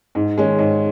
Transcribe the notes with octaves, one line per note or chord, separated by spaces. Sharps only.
G#2
D#3 G#3 C#4
G#2